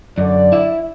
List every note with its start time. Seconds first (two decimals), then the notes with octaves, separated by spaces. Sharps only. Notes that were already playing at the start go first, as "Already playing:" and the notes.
0.18 F#2 D3 D5
0.52 E4 E5